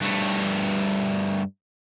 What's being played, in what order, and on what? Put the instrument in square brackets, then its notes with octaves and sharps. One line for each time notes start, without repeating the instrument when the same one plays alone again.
[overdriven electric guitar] G2 A3